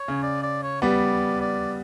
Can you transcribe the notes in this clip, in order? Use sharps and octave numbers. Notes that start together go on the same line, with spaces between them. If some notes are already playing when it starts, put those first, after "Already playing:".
Already playing: C#5
C#3
D5
D5
C#5
G3 B3 D5
D5